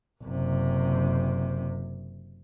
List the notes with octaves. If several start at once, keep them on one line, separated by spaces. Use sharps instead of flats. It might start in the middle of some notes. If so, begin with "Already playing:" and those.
F#1 C3